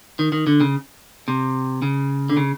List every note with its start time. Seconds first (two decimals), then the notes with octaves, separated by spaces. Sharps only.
0.19 D#3
0.32 D#3
0.47 D3
0.60 C#3
1.28 C3
1.82 C#3
2.30 D3
2.37 C#3